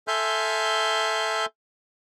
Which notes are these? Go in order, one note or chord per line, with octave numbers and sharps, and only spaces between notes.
A4 E5 G#5 C6 F6 G6